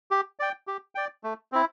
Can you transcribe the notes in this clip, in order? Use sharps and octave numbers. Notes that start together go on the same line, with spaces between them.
G4
D5 G5
G4
D5 G5
A3
C4 E4